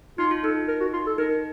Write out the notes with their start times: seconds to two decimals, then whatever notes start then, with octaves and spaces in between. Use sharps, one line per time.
0.18 D#4 F4
0.31 F4
0.44 D#4 A4
0.68 A#4
0.80 F#4
0.93 F4
1.06 A4
1.18 D#4 A#4